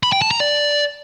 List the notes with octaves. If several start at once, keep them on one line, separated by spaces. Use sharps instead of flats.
B5
G5
A5
A#5
D5